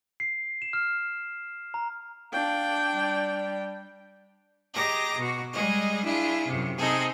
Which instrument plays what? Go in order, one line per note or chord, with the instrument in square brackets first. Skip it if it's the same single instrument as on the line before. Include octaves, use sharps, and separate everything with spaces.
[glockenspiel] C7
E7
F6
A#5
[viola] D4 G5 [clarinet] F5
[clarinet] G3
[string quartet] G4 G#4 D#5 A#5 D6 A#6
B2 F#4
G3 G#3 G#4 D#5
D4 E4 F4 G#4
F#2 C3
C3 C4 D#4 G#4 A4